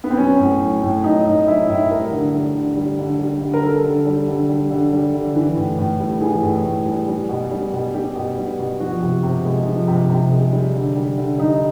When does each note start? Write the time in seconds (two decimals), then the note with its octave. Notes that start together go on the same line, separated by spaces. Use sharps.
0.04 B3
0.10 C4
0.17 F#3 C#4
0.39 A2
0.61 F#3
0.83 A2
1.04 F#3 D#4
1.25 A2 D#4
1.47 F#3 E4
1.68 A2 E4
1.90 G3 A#4
2.12 D3
2.33 G3
2.55 D3
2.76 G3
2.99 D3
3.19 G3
3.41 D3
3.53 A#4
3.63 G3 A4
3.84 D3
4.06 G3
4.28 D3
4.49 G3
4.71 D3
4.92 G3
5.13 D3
5.35 E3
5.57 A2
5.78 A2
6.00 G3
6.21 E3 G#4
6.43 A2
6.65 A2
6.86 G3
7.08 G3
7.29 B2
7.51 G3
7.73 B2
7.94 G3 G4
8.16 B2
8.37 G3
8.59 B2
8.80 F3 F#4
9.02 C3
9.23 C3
9.45 G#3
9.66 F3
9.88 C3
10.09 C3
10.31 G#3
10.53 G3
10.74 D3
10.96 G3
11.17 D3
11.38 G3 D#4